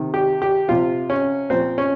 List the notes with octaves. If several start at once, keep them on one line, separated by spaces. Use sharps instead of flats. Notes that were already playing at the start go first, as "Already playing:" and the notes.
Already playing: C3 D#3
G4
G4
C3 F3 F4
C#4
A#2 F3 C4
C#4